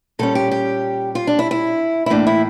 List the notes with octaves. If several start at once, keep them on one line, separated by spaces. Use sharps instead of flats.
A#2 G3 C#4 A4
G4
G4
F4
D4
E4
E4
E4
A2 E3 A#3 D4
E4